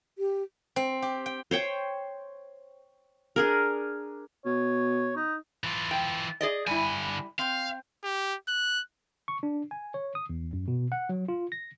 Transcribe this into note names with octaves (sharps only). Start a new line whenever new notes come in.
G4
C4
G4
G5
C5 C#5 G5
D4 G#4 A#4
B2 C#5
D#4
E3 F4
G5
G#4 D5 D#5
D3 G3 E4 G#5
C4 F5
G4
F#6
C#6
D4
G#5
C#5
D#6
E2
F#2
B2
F#5
F#3
F4
A#6